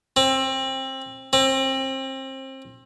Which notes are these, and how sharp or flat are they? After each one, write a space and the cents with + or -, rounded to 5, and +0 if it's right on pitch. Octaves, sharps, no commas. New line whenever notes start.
C4 +25
C4 +30